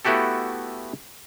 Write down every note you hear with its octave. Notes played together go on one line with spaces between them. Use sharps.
A3 B3 E4 F#4 G4 A4